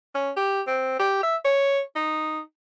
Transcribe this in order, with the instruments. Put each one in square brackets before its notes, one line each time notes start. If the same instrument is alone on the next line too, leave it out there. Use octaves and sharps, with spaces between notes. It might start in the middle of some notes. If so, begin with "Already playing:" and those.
[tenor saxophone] C#4
G4
C4
G4
E5
C#5
D#4